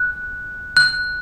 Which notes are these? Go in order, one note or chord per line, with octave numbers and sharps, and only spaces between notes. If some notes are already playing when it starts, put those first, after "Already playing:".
Already playing: F#6
F#6